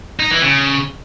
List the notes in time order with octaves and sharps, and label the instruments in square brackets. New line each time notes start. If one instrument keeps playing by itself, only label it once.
[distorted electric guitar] D#4
E3
C#3